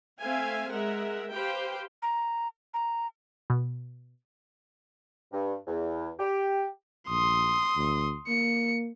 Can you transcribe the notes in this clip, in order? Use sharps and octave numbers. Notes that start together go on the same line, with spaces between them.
A3 C4 E5 F5 G#5
G#3 A#4 E5 F#5
G4 B4 C5 F5 G5
A#5
A#5
B2
G2
E2
G4
A#1 C6 D#6
D2
A#3 C#7